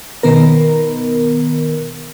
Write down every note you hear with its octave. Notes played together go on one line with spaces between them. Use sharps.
B2 D#3 B3 A#4